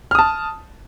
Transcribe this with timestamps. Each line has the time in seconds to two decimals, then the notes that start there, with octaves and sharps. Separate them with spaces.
0.11 F6
0.15 D#6
0.19 A5